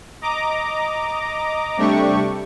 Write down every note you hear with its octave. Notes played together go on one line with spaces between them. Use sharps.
D#5 A#5 D6
C3 G3 A3 D4 G4 C#6